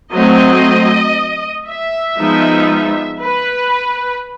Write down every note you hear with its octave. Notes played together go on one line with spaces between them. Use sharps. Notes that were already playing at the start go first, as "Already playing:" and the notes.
F#3 A3 C4 D#5
E5
F3 G#3 B3 D#4
B4